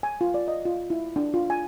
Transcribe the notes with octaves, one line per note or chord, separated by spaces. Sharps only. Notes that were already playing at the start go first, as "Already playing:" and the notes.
G#5
F4
D5
D#5
F4
E4
D4
F4
G#5